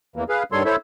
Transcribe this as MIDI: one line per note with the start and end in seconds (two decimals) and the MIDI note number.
0.16 0.24 40
0.16 0.24 52
0.16 0.24 58
0.29 0.43 68
0.29 0.43 71
0.29 0.43 77
0.52 0.63 43
0.52 0.63 51
0.52 0.63 55
0.52 0.63 69
0.52 0.63 73
0.52 0.63 84
0.65 0.76 64
0.65 0.76 69
0.65 0.76 72
0.65 0.76 73
0.65 0.76 76